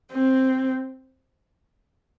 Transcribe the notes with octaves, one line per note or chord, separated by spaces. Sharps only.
C4